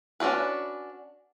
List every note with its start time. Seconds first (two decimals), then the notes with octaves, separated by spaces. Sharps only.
0.20 C#4 D4 F#4 B4